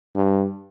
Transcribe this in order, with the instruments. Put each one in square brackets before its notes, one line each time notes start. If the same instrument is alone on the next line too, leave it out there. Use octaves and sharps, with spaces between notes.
[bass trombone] G2